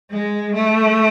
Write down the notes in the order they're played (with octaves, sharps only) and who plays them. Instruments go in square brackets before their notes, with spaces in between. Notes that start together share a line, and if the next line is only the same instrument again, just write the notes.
[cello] G#3
A3